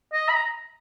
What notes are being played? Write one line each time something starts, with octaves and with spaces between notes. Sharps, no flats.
D#5
B5
A#5